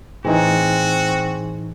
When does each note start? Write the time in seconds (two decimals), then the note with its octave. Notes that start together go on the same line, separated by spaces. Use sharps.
0.25 A2 E3 C4 D#4 F#4 G#4 G#5